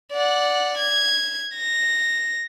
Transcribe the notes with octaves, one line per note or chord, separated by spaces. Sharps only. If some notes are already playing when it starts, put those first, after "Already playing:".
D5 F#5
G#6
A#6